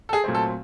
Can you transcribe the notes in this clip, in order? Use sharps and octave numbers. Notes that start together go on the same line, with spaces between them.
A4
G#4
A#2 F#3 A3 C4
A4